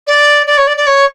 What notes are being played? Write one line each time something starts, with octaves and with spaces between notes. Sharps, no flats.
D5
D5
C#5
D5
D5
C#5